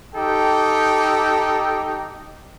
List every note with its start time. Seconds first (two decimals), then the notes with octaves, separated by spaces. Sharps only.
0.14 D#4 G4 A4 G5